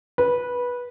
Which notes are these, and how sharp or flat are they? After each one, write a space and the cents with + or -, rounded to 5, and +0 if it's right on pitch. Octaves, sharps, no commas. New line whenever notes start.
B4 -15